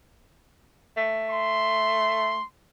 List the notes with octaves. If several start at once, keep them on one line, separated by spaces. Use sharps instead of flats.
A3
C6